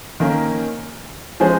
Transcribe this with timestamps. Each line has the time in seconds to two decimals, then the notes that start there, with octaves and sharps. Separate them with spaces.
0.20 D#3 A#3 C#4
1.40 F3 G#3 C#4 G#4 C5